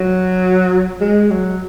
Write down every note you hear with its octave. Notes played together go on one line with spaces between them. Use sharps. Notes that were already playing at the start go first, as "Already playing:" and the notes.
Already playing: F#3
G#3
F#3